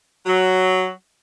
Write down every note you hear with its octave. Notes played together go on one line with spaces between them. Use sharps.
F#3